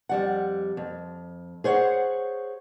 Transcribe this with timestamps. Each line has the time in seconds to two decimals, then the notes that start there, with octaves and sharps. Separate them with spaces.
0.09 F2 G3 F#5
0.77 F2
1.64 G#4 C5 C#5 F5 F#5